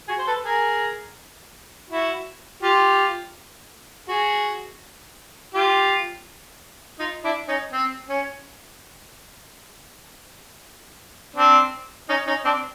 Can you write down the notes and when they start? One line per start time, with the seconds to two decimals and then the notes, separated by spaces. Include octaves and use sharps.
0.08 F#4 G#4
0.19 C5
0.27 A4 B4
0.45 G#4 A#4
1.90 E4 F#4
2.63 F4 G4
4.08 F#4 G#4
5.54 F4 G4
6.99 D#4 F4
7.24 D4 E4
7.48 C#4 D#4
7.72 C4
8.09 C#4
11.36 C4 D4
12.09 C#4 D#4
12.27 C#4 D#4
12.45 C4 D4